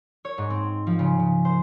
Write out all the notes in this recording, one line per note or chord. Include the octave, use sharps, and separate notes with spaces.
C#5
G#2
C4
F3
C#3
C#3
C5